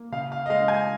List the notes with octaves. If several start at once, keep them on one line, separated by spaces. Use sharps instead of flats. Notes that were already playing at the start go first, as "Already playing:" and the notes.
Already playing: A#3
C#3 F5
F5
D#5
G#3 F5
G#5